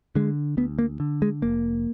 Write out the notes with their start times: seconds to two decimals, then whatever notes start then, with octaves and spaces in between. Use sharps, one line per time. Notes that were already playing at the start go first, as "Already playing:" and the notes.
0.15 D3 G#3
0.57 D2 B3
0.79 A#3
1.00 D3
1.22 G#3
1.42 F1 A#3